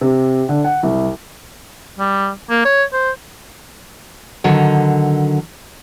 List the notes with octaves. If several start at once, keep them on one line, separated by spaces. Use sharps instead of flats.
C3
D3
F#5
C2
G3
A#3
C#5
C5
D3 D#3 F#3